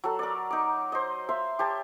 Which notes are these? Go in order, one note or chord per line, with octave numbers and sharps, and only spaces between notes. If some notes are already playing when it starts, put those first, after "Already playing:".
F#3 A4
A#4 D5
D#4 D6
C5 D#5
E5 F5 C6
G4 C#5 A5